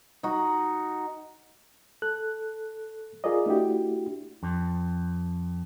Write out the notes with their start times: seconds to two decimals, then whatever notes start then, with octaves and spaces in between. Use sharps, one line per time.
0.23 D#4 F#4
2.02 A4 F#6
3.24 F4 G#4 A#4 D5 D#5
3.46 A3 D4 E4 F#4 G4
4.43 F2